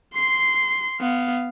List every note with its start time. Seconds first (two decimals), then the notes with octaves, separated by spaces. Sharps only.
0.15 C6 C7
1.00 B3 F5